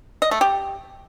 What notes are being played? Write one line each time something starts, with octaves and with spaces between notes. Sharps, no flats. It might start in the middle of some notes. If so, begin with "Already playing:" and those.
D#5
A3
G4